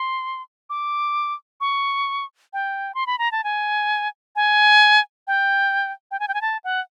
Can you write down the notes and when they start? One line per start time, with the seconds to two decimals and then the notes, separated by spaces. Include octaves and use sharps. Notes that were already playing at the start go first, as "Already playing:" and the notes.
Already playing: C6
0.70 D6
1.61 C#6
2.53 G5
2.95 C6
3.07 B5
3.19 A#5
3.32 A5
3.44 G#5
4.36 G#5
5.27 G5
6.11 G5
6.20 G#5
6.28 G5
6.34 G#5
6.41 A5
6.64 F#5